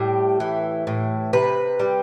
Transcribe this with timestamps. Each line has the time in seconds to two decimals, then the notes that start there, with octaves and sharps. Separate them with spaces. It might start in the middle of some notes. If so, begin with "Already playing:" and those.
Already playing: A2 G3 G4
0.40 E3
0.87 A2
1.33 C3 B4
1.80 G3